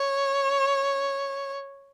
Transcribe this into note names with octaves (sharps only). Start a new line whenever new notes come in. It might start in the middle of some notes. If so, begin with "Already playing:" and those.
Already playing: C#5